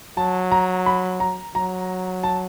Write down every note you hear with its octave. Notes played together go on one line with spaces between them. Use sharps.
F#3 A5
A#5
B5
A#5
F#3 A#5
A5